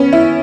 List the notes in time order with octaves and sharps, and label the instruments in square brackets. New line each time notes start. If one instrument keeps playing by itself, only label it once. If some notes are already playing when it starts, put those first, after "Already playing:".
Already playing: [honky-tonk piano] B3 C#4
E4